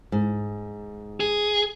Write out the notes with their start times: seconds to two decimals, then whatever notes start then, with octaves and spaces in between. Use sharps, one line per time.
0.12 G#2
1.20 G#4